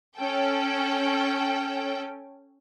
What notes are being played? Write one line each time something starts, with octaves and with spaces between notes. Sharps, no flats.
C#4 A4 G5